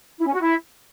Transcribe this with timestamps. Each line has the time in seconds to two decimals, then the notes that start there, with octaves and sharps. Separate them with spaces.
0.19 E4
0.26 C#4
0.33 F#4
0.40 E4